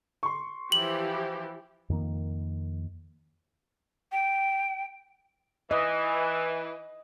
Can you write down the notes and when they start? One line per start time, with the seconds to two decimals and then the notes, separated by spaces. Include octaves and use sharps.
0.23 C6 C#6
0.72 E3 F3 G4 F#7
1.90 F2 D#3 A#3
4.12 G5
5.71 E3 D#5